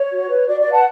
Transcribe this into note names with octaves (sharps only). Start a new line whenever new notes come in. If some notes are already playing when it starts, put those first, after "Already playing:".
Already playing: C#5
F#4
B4
F#4 D5
D5
B4
F#5 A5